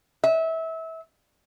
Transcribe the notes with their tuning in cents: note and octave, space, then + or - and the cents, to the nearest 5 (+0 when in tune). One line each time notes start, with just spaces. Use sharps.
E5 -25